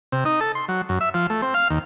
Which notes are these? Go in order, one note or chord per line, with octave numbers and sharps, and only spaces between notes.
C3
D#4
A4
C6
F#3
F#2
E5
F3
A3
C4
F5
D#2